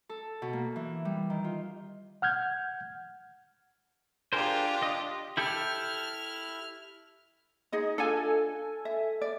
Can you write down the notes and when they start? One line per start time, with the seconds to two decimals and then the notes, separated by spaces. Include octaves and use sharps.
0.09 A4
0.42 B2
0.53 A#3
0.76 E3
1.05 G3
1.30 D#3
1.44 F4
2.22 F#5 F6 G6 G#6
4.33 D4 F4 G4 G#4 A#4 C5
4.83 D#5
5.37 E4 G4 A4 F6
7.72 D#4 G#4 D#5
7.98 D4 F4 A4 G#5
8.85 E5
9.21 D5